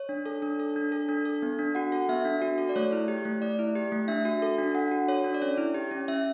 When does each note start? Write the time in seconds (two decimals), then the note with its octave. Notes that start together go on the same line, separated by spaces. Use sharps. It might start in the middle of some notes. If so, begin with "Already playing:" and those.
Already playing: C#5
0.09 D4
0.26 A4
0.42 D4
0.59 A4
0.76 D4
0.92 A4
1.09 D4
1.25 A4
1.42 B3
1.59 D4
1.75 F#4 F#5
1.92 A4
2.09 B3 E5
2.25 D4
2.41 F#4
2.58 A4
2.69 D5
2.76 A3 C#5
2.92 E4
3.08 G4
3.25 A3
3.42 A3 D5
3.59 E4
3.75 G4
3.92 A3
4.08 D4 E5
4.25 F#4
4.42 A4
4.58 D4
4.75 D4 F#5
4.91 F#4
5.08 A4 C#5
5.24 D4
5.34 D5
5.42 C#4 C#5
5.58 E4
5.74 G4
5.91 C#4
6.08 C#4 E5